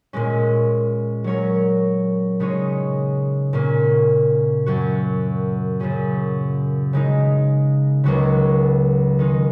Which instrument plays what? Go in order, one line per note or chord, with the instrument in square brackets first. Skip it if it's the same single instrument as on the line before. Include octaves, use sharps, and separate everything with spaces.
[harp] A#2 G#3 C#4
F#3 C#4 A#4 C#5
C#3 G#3 D#4 G#4 C#5
A#2 A#3 C#4
F#2 F#3 C#4 F#4
F#2 C#3 A#3 C#4 G#4
C#3 G#3 D#4
C#2 C#3 F#3 A#3 F#4
D#3 G#3 D#4 G#4